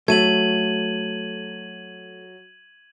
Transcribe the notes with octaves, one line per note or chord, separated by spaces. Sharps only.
F#3 A3 G#6 D#7 F#7